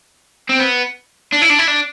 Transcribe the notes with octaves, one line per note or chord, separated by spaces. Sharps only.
C4
B3
D4
E4
D4
E4
D4